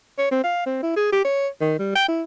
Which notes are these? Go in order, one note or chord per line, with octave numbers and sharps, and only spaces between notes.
C#5
C4
F5
C4
E4
G#4
G4
C#5
D#3
G3
G5
E4